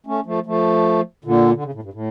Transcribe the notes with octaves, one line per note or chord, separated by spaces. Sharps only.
A3 C#4
F3 A3
F3 A3
A#2 D3
D3
C#3
A2
G2
A2